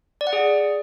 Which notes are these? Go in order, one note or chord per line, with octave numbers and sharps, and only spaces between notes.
D5
F#5
G#4